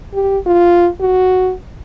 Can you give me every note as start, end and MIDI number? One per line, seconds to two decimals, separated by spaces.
0.14 0.38 67
0.46 0.88 65
1.00 1.53 66